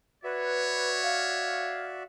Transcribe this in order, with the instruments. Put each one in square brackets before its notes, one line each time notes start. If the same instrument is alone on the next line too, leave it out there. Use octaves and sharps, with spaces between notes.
[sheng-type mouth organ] F#4 D5 E5 [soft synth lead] B4 [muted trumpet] C#5
[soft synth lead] F5